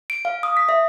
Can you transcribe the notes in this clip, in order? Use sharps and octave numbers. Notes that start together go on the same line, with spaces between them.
D7
F5
D#6
B6
E5